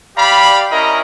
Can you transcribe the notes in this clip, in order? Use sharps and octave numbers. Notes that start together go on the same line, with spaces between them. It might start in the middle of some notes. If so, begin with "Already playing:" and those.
G4 D5 F5 B5
C#4 E4 A#4 D#5 A#5